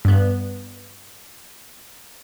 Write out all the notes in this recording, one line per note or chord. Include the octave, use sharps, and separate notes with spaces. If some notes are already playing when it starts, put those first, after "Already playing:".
G2 B3